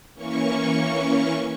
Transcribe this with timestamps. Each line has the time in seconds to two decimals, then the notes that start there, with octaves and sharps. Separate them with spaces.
0.14 E3 A#3 C#4 C#6